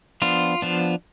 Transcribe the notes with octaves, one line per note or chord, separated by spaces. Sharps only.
F3 B3 D4 F4
F3 B3 D4